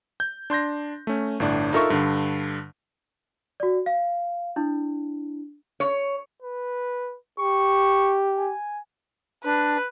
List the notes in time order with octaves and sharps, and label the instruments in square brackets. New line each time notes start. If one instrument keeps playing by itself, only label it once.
[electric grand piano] G6
D4 C6 G6 A#6
A3 C#4
G1 A2 D4
D#4 F4 A4 A#4 E5 C#6
G2 D3
[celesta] F#4 D5
F5
D4 E4
[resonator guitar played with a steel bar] C#5
[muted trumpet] B4
[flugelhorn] G4 [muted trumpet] C#6
[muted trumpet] G#5
[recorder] D4 [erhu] B4